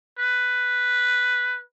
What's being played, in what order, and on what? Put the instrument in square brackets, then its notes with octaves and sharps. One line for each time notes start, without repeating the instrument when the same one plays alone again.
[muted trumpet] B4